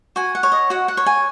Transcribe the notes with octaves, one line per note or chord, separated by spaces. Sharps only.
F#4 G#5
F#5
C#5
D#5
F#4 F#5
F#5
C#5
G#5